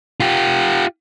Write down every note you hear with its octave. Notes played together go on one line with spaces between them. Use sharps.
F4 G4